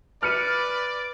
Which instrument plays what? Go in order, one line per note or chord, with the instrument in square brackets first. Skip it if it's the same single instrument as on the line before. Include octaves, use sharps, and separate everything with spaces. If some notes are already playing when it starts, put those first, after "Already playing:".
[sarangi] B4 [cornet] D5 [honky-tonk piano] F6 C#7 D#7